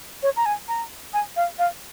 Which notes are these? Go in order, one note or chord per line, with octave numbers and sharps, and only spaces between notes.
C#5
A#5
G#5
A#5
G#5
F5
F5